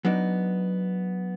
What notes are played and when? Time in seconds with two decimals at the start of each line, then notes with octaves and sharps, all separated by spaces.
0.05 F#3 B3 D4 D#4